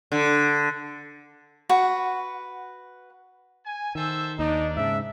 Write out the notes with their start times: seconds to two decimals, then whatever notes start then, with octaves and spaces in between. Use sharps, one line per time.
0.12 D3
1.69 F#4 B4 F#5
3.65 G#5
3.95 D#3 A4 C5 E5
4.39 D#2 D4 D#4
4.77 G#2 C#3 E5